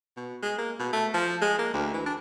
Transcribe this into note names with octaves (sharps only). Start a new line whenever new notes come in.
B2
G#3
A#3
B2
A3
F3
G#3
A#3
D2
E3
D4